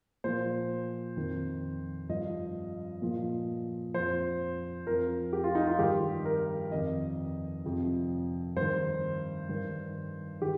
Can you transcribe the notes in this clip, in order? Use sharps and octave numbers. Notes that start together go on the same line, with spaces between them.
A#2 F3 C5
F2 D#3
G2 F3 D#5
A#2 F3
F2 F3 C5
F2 F3 A#4
G4
F4
D#4
F4
G2 D#3 G4
A#4
F2 D#3 D#5
F2 C3 F3
G2 D#3 C5
G2 D#3
D#3 G4